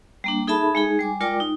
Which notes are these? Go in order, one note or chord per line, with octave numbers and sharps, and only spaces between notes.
G3 A#3 D4
D#4 G#4 A4 E5 A5 B5
G#3 D#4 G#4
G3 G#5 D6
G#3 F4 A#4 D5 G5 D6
D#4